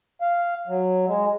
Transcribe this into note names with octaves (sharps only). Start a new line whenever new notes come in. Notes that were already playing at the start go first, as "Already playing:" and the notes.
F5
F#3
G#3